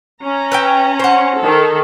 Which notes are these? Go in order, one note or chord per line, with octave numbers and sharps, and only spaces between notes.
C#4 A#5
B4 E5 G5
C5 F#5
D#3 A4